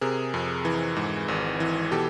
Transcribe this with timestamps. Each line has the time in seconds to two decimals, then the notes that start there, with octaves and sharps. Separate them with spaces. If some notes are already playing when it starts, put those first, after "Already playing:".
0.01 C3 G#4 A#4
0.34 F2
0.65 E3
0.96 G#2
1.28 G#1
1.60 E3
1.91 B2 G4 A4